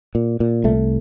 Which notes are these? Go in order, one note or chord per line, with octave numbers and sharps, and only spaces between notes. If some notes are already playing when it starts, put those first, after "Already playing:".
A#2
A#2
C2 A3